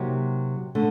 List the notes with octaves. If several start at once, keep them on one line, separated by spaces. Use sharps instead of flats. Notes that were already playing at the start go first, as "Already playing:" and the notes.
Already playing: C3 F#3 A#3 D#4 G4
D3 A3